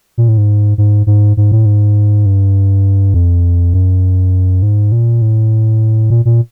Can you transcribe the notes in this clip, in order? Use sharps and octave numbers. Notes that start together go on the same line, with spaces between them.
A#2
A2
G#2
G#2
G#2
G#2
A2
G#2
G2
F2
F#2
G#2
A#2
A2
A#2
A#2